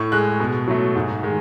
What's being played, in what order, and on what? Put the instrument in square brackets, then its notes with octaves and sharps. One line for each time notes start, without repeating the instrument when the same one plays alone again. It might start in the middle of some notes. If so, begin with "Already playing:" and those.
Already playing: [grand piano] A2 C#6
G#3 F#6
B2
F#3 A3
G#2
D#3 G#3